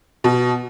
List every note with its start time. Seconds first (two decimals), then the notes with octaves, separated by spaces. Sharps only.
0.24 B2